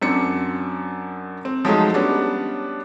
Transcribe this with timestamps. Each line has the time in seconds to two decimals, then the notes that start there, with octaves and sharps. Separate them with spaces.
0.02 F#2 C4 D4 C#7
1.45 C4
1.65 F3 F#3 G#3 A3 D#4
1.94 G3 B3 C#4 D4